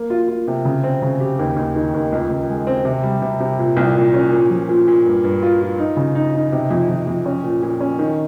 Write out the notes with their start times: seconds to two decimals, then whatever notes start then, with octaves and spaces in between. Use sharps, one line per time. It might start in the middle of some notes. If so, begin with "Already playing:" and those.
Already playing: A#3
0.10 F4
0.28 F4
0.47 C3
0.65 C#3
0.84 C4
1.02 C#3
1.20 G4
1.39 D#2
1.56 D#2
1.76 D#3
1.94 D#2
2.12 C#2
2.30 C#2
2.49 G#3
2.67 C4
2.85 C3
3.03 G3
3.22 C3
3.40 C3
3.59 A#2
3.77 C2
3.95 A#2
4.14 C#4
4.32 A#2
4.50 F3
4.69 A#2
4.88 A#2
5.05 G2
5.24 G2
5.43 F4
5.61 F4
5.79 D#4
5.97 C#3
6.15 D#4
6.34 D#4
6.52 C3
6.71 F2
6.89 F2
7.07 F2
7.26 C#4
7.44 A#2
7.63 A#2
7.80 C#4
7.99 D#3